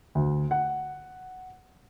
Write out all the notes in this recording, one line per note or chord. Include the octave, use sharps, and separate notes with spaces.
D2
F#5